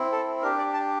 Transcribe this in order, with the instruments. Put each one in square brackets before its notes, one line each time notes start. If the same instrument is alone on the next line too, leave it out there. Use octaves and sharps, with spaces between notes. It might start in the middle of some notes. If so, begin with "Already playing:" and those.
Already playing: [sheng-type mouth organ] C4 E4
A4
D4 G4 A#4
D5
A5